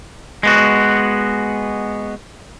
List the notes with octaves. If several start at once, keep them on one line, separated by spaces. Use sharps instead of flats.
G#3 B3 F#4